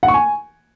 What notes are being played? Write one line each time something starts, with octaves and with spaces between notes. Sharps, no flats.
F#5
C#6
G#5